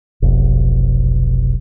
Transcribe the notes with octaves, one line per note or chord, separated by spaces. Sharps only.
F1 B1